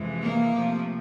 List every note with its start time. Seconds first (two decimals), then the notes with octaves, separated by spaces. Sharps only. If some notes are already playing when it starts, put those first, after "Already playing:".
Already playing: F2 C3 E3 G#3
0.22 A#3
0.52 C3 F3 A3